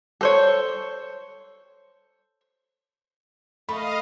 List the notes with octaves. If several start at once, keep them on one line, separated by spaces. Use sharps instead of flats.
A4 C5 C#5
A3 D#5 F5 B5